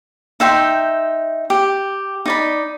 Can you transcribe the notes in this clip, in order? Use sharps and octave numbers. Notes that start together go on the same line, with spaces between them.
D#4 E5 G5 C6
G4
D#4 D5 B5